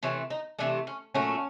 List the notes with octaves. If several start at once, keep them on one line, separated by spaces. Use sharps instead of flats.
C3 E3 A3 C#4
D#4
C3 E3 A3 D4
C#4
A#2 F#3 A3 C#4